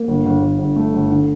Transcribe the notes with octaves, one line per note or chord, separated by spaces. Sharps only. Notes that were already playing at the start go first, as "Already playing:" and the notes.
Already playing: A#3
G1
G1
G1
G1
A3
G1
D3